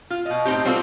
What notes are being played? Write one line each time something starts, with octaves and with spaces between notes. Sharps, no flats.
F4
B2 D#5
A2 C4 D#4 G4
G3 C4 F4 F#4 A4